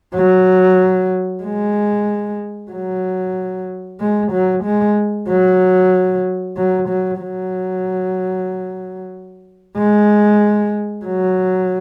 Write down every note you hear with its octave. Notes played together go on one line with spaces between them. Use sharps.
F#3
G#3
F#3
G#3
F#3
G#3
F#3
F#3
F#3
F#3
G#3
F#3